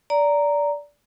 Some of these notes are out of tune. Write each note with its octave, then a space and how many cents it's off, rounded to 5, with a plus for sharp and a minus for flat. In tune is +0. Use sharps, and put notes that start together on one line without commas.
D5 -15 A#5 -5